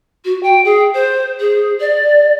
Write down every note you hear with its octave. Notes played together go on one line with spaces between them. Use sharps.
F#4
G5
G#4
C5
G#4
D5